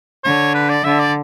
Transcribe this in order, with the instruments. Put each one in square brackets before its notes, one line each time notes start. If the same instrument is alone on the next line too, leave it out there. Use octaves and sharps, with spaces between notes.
[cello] D3 [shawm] C#5
[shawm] B4
D5
[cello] D3 [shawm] E5
[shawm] D5